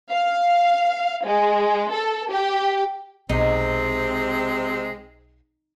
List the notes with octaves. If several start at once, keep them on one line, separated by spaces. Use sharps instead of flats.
F5
G#3
A4
G4
B1 C3 G#3 C4 D#4